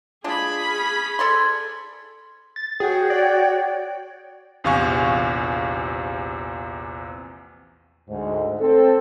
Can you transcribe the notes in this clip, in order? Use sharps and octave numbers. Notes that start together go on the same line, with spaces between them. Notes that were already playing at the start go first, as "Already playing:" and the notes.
G#3 D4 F4 G#4 G#5 B5
C#4
A4 D5 G#5 C6
A6
F#4 G#4 C#5 G5
D5
A#1 E2 C3 F5 G#5 C#6
D2 G#2
C4 A4